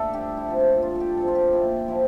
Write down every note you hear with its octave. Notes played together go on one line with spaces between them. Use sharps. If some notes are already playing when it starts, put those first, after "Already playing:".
Already playing: D3 A3 D4 A4 E5
G2 G4
E4
F3 C4
F4
G2 F4
G4 A4
F3 C4 A4
F4
G4
A#2 E4
F3 A#3 E4 F4